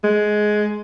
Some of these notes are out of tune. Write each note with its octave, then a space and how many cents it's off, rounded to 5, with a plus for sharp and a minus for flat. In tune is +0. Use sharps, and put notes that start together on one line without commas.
G#3 +15